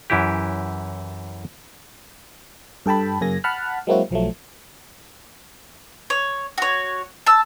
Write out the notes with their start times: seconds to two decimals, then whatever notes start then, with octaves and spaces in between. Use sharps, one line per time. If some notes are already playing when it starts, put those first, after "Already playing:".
0.10 F#2 E3 E4 G4
2.86 G2 A4 G5 A5 B5
3.21 F#2 C#3 A#3 G#5 A#6
3.44 F#5 A5 B5 F6 F#6
3.87 F#3 G#3 A#3 C4 E4 F#4
4.11 B1 F3 F#3 A3
6.10 C#5
6.58 F#4 C#5
7.26 A5 E6